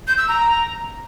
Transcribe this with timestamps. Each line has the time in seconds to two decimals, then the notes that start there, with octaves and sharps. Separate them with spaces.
0.07 G6
0.18 E6
0.28 A#5